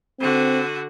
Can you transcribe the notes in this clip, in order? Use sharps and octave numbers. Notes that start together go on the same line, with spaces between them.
D3 C4 F#4